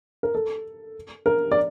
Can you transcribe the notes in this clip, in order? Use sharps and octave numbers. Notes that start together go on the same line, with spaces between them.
A#4
A4
A#4
D5